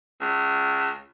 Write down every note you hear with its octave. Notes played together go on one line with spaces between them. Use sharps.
C#2